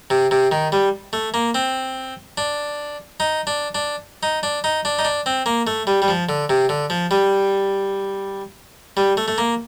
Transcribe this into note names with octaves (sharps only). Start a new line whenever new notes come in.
C3
C3
D#3
G3
A3
A#3
C4
D4
D#4
D4
D4
D#4
D4
D#4
D4
D#4
D4
C4
A#3
A3
G3
G3
F3
D3
C3
D3
F3
G3
G3
A3
A3
A#3